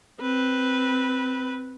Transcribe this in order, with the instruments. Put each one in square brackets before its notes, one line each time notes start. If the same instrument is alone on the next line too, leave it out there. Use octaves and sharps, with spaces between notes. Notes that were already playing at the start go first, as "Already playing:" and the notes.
[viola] C4 B4